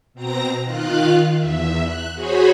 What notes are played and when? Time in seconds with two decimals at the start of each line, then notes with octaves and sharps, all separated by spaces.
0.14 B2 C4 A#5 A#6
0.65 D#3 F4 F5 F#6
1.37 E2 E5
1.82 F#6
2.13 F#4 G#4 C5 C#5 B5